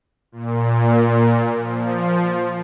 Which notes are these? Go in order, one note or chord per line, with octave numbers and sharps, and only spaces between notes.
A#2
F3